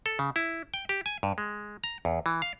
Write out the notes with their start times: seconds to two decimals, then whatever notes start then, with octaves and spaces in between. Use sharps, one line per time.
0.06 A4
0.19 C#3
0.36 E4
0.74 G5
0.89 G4
1.06 G#5
1.23 G2
1.38 G#3
1.84 A#5
2.05 E2
2.26 E3
2.42 F5